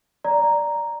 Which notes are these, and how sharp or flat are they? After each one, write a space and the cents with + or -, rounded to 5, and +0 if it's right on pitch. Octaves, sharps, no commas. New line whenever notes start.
D5 +0 A#5 +0